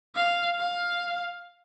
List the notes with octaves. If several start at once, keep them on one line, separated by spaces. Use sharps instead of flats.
F5
F5